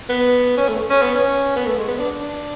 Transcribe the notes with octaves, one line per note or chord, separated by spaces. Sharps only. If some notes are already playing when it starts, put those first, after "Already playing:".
B3
C#4
A3
C#4
B3
C#4
B3
A3
G#3
B3
D4
D4